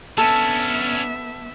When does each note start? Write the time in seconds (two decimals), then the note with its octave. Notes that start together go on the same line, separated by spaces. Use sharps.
0.18 B3 C#4 D4 A4 E5